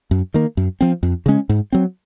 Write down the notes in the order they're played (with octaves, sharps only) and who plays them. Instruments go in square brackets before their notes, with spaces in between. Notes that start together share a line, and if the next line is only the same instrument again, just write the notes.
[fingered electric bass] F#2
D#3 A#3
F#2
F3 C4
F2
C#3 G#3 C#4
G#2
F#3 C4